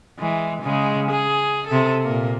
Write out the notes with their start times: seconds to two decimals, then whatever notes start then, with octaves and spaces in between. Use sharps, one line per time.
0.19 E3 G#3
0.63 C#3 G#3
1.11 G#4
1.67 C3 A4
2.03 A#2 A#3